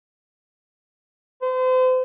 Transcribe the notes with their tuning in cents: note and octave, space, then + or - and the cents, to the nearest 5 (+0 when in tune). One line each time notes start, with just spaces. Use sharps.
C5 -35